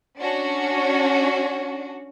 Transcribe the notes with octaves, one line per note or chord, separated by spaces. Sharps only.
C#4 D4 F#4